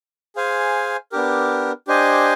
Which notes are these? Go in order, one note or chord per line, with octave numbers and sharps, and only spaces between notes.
G#4 C5 F5 G#5
B3 D4 G4 A#4
D4 G4 C5 D#5 G#5